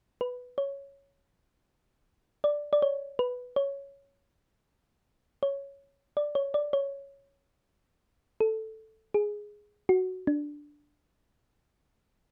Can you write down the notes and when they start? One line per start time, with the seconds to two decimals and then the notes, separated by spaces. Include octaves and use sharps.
0.21 B4
0.58 C#5
2.44 D5
2.73 D5
2.82 C#5
3.19 B4
3.56 C#5
5.43 C#5
6.17 D5
6.35 C#5
6.54 D5
6.73 C#5
8.40 A4
9.14 G#4
9.89 F#4
10.27 D4